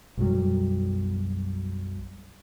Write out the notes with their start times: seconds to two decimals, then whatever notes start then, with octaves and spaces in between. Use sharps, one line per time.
0.17 B1 F#2 F#3 G3